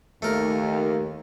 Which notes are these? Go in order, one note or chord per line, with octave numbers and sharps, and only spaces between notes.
D#2 A3 A#4